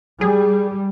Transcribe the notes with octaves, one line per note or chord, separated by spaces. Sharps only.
G3 G#4